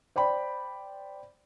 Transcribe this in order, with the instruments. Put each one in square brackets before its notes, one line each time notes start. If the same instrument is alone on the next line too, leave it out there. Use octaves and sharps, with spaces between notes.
[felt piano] C5 D5 G5 B5